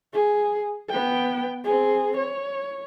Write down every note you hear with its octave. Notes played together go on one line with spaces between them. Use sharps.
G#4
B3 G5
C4 G#4
C#5